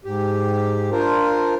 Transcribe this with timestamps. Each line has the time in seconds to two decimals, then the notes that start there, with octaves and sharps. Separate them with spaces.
0.05 G#2 G4
0.92 D4 F4 A#4 C5